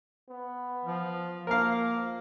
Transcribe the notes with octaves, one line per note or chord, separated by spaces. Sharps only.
B3
F3
F3 A#3 A#4 F5